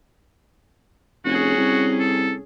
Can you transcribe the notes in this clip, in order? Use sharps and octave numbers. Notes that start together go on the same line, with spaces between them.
F1 C#4 F#4 G#4
C2
A4